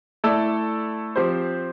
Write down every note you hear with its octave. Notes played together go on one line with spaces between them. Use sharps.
A3 E4 A4 D5
F3 C4 G4 C5